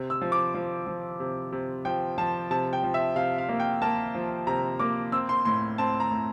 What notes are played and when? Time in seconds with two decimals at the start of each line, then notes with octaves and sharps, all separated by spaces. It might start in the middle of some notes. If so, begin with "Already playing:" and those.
Already playing: C3
0.10 E6
0.21 F3
0.32 D6
0.54 F3
0.87 F3
1.20 C3
1.52 C3
1.85 F3 G5
2.18 F3 A5
2.51 C3 A5
2.73 G5
2.83 F3
2.94 E5
3.16 C3 F5
3.38 F5
3.49 A#3
3.60 G5
3.82 A#3 A5
4.15 F3
4.47 C3 A#5
4.80 A#3 D6
5.12 C4 E6
5.29 C6
5.45 A2 C6
5.78 C4 A5
6.00 A#5
6.11 A2